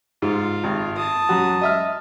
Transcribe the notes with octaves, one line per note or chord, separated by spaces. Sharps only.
G#2 F4
G#1
A5 D#6
F#2 F#4
D#5 E5 F6